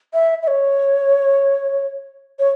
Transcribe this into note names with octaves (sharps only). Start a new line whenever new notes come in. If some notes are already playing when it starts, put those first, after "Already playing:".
E5
E5
C#5
C#5